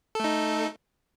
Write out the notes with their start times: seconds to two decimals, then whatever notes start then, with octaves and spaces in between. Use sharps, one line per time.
0.15 A4
0.20 A3
0.24 D#4